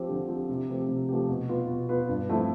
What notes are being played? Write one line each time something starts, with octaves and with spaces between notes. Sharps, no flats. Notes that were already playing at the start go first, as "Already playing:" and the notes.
Already playing: F3 C4 G4
D3
F3 C4 G4
C3
F3 A3 C4 G4
C3
F3 A3 C4 G4
B2
B3 F4 B4
B2
B3 F4 B4
G2
F3 A3 C4 E4